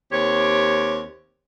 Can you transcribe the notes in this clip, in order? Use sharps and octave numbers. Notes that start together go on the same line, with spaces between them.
D#2 C4 G4 C#5